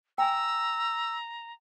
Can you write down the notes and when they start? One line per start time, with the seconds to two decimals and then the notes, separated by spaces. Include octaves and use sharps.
0.18 G5 G#5 A#5 E6